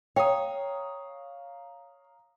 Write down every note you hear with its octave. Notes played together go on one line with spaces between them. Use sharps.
C#5 F5 G5 A#5 D#6